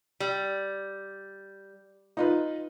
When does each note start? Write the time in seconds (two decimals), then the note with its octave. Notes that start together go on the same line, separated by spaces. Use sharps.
0.20 G3
2.17 D#4 F4 B4